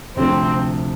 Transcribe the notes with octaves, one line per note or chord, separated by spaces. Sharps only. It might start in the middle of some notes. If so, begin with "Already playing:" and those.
D2 C3 F3 A3 C4